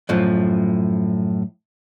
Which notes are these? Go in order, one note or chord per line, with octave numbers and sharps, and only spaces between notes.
F#2 A2 F3